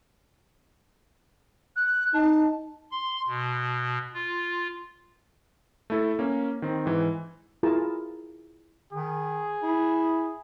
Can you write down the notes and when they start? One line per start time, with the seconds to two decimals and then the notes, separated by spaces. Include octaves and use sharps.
1.76 F#6
2.14 D#4 A5
2.92 C6
3.27 B2
4.14 F4
5.90 A3 E4 A4
6.19 A#3 C#4
6.62 D#3 C4
6.86 G#2 E3
7.63 E4 F4 G#4 A#4 A5 A#5
8.93 D#3 G#4
9.63 E4